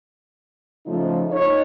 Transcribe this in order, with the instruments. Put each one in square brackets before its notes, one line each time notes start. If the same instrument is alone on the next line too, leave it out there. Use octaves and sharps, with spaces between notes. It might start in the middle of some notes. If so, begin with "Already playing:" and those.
[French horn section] C#3 F3 A3 D#4 F4
D#4 C#5